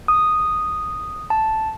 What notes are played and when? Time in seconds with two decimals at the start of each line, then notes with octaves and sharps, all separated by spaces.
0.08 D#6
1.30 A5